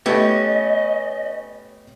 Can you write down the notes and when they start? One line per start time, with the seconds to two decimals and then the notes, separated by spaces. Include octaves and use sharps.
0.06 A3 B3 C#4 G4 D#5